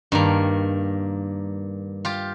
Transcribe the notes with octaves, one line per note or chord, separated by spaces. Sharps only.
G2 D#3 A#3
F4 G4